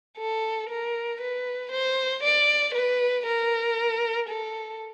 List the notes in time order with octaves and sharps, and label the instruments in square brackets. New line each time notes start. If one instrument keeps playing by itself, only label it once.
[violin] A4
A#4
B4
C5
D5
B4
A#4
A4